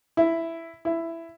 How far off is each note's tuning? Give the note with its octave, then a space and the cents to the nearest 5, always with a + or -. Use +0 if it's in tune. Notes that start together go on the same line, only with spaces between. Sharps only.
E4 +5
E4 +10